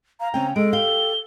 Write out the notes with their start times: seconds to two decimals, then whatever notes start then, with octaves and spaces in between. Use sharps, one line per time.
0.20 F5 A#5
0.34 C#3 C4 C#4 G5
0.56 G#3 A4 D7
0.73 G4 F5 G7